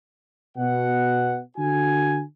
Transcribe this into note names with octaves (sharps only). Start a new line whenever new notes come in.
B2 F#5
D3 F#4 G#5